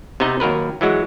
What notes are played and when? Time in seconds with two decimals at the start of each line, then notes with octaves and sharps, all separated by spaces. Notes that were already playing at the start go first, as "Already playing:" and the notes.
0.20 C3 B3 D#4 D#5
0.40 D#2 F#3 A#4 B4
0.81 E3 F#3 G#3 F#4